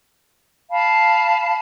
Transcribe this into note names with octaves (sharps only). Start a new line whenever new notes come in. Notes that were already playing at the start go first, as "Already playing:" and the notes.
F5 A5 B5